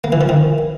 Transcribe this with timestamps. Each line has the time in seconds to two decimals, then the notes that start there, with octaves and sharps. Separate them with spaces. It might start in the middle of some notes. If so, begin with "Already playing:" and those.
0.04 A#3
0.12 E3
0.21 F3
0.29 D#3